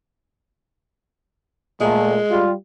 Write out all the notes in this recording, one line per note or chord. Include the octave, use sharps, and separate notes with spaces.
A#2 G#3 A3
G3 F4